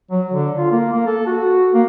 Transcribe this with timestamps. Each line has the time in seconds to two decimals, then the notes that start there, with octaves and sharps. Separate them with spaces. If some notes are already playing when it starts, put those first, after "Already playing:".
0.11 F#3
0.32 D3
0.58 F4
0.71 A#3
0.92 A#3
1.06 A4
1.27 F#4
1.74 A#3